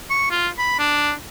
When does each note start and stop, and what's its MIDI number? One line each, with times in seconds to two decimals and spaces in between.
0.10 0.27 85
0.31 0.47 65
0.58 0.79 83
0.79 1.11 62